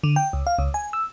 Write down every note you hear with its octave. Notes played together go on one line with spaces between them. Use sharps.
D3
G5
C#2
F5
C#2
G#5
E6